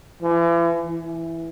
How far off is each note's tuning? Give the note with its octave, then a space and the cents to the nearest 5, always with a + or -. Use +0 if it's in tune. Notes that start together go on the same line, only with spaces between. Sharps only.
E3 +40
E3 +5